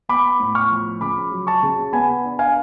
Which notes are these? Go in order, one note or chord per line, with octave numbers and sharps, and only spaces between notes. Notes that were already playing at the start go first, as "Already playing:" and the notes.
B3 B5 D6
A2
C#6 F6
F3
C#3 B5 D6
F#3
A5 C#6
C#3
B3 G#5 B5
D4
F5 G#5